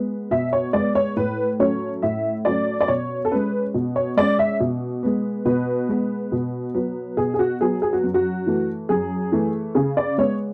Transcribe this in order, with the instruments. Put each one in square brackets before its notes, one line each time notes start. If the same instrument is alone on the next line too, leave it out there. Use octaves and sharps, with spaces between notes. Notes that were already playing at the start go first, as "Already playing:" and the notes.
Already playing: [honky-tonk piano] G#3 B3
B2 E5
C#5
G#3 B3 D5
C#5
A2 B4
F#3 A3 C#4 C#5
A2 E5
F#3 A3 C#4 D5
D5
B2 C#5
A4
G#3 C#4 B4
B2
C#5
G#3 C#4 D5
E5
B2
G#3 B3
B2 B4
G#3 B3
B2
F#3 B3
B2 G#4
G#4
F#4
F#3 B3 G#4
G#4
F#4
F#2
F#4
E3 A3
F#2 G#4
E3 A3
C#3 G#4
D5
G#3 B3 C#5